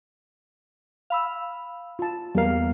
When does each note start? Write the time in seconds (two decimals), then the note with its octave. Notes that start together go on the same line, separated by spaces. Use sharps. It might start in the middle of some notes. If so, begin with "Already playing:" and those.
1.10 F5 B5 E6
1.99 F4 A5
2.35 E2 G3 A#3 A#4 F5